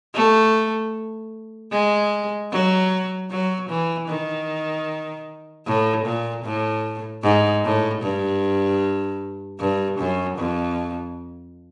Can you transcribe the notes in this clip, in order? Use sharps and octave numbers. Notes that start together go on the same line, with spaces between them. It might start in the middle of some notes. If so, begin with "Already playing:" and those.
A3
G#3
F#3
F#3
E3
D#3
A2
A#2
A2
G#2
A2
G2
G2
F#2
F2